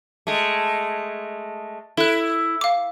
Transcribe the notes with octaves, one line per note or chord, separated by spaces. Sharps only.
G#3 A3
E4 A4 F#6
F5 D6